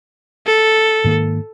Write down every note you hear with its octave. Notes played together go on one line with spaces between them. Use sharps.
A4
G#2 D#3 A#3